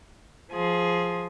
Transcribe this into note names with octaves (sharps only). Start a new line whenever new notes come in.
F3 G#4